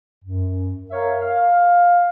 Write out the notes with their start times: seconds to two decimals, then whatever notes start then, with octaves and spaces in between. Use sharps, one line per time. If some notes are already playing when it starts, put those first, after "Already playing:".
0.23 F#2
0.91 A#4 C#5 E5 F5
1.20 F5